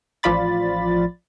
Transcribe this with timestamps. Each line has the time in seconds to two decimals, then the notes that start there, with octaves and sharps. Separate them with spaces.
0.23 A1 F3 F4 D5 B5 A6